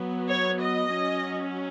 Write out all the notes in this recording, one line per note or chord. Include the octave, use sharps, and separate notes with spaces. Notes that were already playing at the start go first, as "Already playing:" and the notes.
Already playing: F#3 B3
C#5
D#5
F#3 C#4